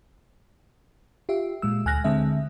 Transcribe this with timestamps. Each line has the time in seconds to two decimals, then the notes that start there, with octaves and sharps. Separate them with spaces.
1.29 F4 G4 E5
1.62 A#2 G#3 E6
1.86 D2 G#5 F6 F#6 A#6
2.04 D3 G#3 C4 E5